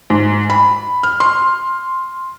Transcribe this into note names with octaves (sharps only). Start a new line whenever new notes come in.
G#2
B5
F6
C6